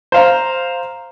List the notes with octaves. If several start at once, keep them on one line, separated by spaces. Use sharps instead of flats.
C5 F5 A#5